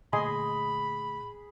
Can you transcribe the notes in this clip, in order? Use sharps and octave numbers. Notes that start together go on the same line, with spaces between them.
A#2 D3 A3 G#4 D#5 G#5 B5 C6